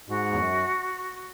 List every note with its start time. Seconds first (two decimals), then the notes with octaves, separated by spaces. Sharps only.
0.08 G#2 F#4
0.32 E2
0.39 F#2